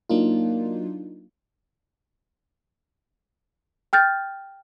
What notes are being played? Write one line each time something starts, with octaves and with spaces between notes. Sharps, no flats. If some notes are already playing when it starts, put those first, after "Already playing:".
F#3 A#3 D4 D#4 F4
G5 F6 G6 A6